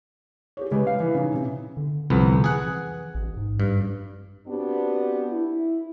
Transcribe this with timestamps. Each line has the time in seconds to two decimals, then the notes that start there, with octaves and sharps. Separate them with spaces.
0.57 G4 G#4 C#5
0.71 C#3 G#3 G4 B4
0.87 F5
1.00 E3
1.15 C#3 D#4
1.34 C3
1.77 D3
2.10 C2 F2 D3 B3
2.44 E3 G#4 F#5
3.15 A1
3.37 G#2
3.60 G2
4.47 B3 C4 D4 F#4 G4
5.31 E4